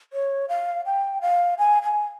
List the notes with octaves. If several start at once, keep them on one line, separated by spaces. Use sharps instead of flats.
C#5
F5
G5
F5
G#5
G#5